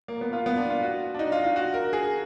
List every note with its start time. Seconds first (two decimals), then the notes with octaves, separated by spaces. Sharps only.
0.08 A#3
0.21 B3
0.33 F4
0.46 B3
0.57 D4
0.70 F4
0.82 F#4
1.14 D4
1.19 D#4
1.32 F4
1.44 F4
1.56 F#4
1.74 A#4
1.93 G#4